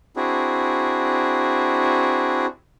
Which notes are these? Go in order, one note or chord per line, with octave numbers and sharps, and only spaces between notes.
C4 D4 E4 F#4 G#4